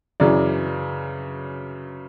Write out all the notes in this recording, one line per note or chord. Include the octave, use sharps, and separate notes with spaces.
F#2 C#3 E3 D5